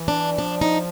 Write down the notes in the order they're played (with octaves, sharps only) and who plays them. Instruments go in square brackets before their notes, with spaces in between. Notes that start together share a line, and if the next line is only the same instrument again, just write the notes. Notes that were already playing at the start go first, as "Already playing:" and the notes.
Already playing: [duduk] E3
[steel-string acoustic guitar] D4
[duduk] F3 [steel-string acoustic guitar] D4
[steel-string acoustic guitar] D#4